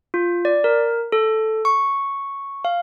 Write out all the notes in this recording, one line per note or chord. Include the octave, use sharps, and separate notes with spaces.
F4
D5
A#4
A4
C#6
F5